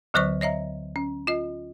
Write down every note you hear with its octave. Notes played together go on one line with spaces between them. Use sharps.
D2 D3 F#3 C5 D5 C#6
C#5 D#5 E5 A#5
C#4
F4 D#5